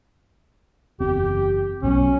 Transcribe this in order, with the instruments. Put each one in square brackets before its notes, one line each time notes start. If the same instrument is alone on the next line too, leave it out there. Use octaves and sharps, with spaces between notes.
[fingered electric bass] F#1 E2 C4 [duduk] G4
[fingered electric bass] B1 B2 F#3 [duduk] C#4